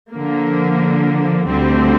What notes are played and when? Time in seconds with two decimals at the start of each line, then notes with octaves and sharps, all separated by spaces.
0.11 D3 F3 A#3
1.46 D2 D3 G3 C4